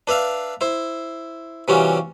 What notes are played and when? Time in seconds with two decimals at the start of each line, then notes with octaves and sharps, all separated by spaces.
0.07 D4 B4 E5 F5
0.61 E4 C5
1.68 C3 E3 G3 C#4 F4 F#4